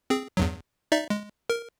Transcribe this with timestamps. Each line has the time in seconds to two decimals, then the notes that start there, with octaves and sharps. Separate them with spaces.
0.10 C4 G#4
0.37 E2 G2 F#3
0.92 D#4 D5 E5
1.10 G#3
1.50 A#4